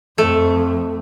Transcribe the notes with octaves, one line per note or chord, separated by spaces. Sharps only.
F2 A3